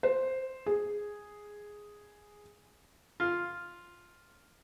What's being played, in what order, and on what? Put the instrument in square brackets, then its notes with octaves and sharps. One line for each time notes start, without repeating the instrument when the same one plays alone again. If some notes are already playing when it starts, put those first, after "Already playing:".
[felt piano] C5
G#4
[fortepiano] F4